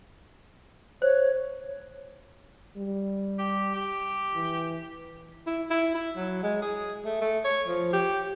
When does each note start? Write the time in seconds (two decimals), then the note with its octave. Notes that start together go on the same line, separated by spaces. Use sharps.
1.02 C5 C#5
2.77 G3
3.39 G4
3.75 G4
4.34 E3
5.47 E4
5.70 E4
5.95 E4
6.16 F#3
6.43 G#3
6.62 G#4
7.05 A3
7.21 A3
7.44 C#5
7.67 F3
7.93 G4